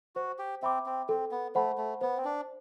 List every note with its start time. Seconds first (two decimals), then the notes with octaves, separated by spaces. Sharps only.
0.16 F#4 C5
0.39 G4
0.62 C4 E5 B5 D6
0.86 C4
1.09 C4 A4
1.31 B3
1.55 A3 C5 F#5 B5
1.78 A3
2.01 B3 C5
2.17 C4
2.25 D4